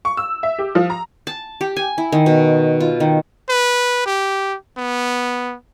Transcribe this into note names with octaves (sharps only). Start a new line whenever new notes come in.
C#6
E6
E5
G4
F3
A#5
A5
G4
G#5
E4
D#3
B2
F4
D#3
B4
G4
B3